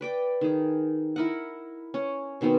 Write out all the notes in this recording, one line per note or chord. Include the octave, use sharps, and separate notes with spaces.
B4 D5 G5
D#3 G#4
E4 A#4 D#5 F#5
C#4
B2 D#3 B3 C4